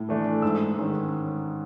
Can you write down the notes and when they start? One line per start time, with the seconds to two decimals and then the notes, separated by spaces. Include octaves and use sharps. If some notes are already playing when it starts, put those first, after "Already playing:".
Already playing: A2
0.09 E3 A3 D4
0.42 G#2 E6
0.78 D#3 G#3 C#4